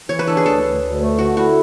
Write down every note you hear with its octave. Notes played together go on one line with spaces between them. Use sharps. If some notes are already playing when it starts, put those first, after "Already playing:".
E3 C#5
B4
D4 A4
G#4
D2 A4
D2
D2
A3
D3 F#4
E4 F#4